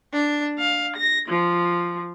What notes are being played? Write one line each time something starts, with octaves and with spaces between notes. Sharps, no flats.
D4
F5
A#6
F3